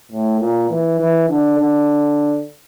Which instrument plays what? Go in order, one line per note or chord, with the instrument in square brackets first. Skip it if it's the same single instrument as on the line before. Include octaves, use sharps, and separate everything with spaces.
[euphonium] A2
A#2
E3
E3
D3
D3